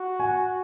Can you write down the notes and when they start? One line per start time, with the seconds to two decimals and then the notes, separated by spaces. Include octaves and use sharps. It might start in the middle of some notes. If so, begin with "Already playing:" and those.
Already playing: F#4
0.20 G#5